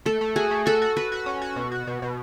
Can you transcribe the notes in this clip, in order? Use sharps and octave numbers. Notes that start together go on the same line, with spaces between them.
A3 A4
A3
F#4 G#4
A3
F#4 A4
F#4
F#4 B4
F#4
C#4
F#4
B2
F#4
B2
B2